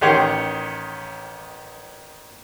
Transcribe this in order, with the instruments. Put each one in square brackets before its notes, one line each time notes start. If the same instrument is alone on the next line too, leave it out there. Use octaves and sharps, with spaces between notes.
[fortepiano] A1 D#3 G4 C#5 F#5 C6